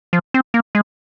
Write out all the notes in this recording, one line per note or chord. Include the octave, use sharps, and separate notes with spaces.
F3
C4
A#3
G#3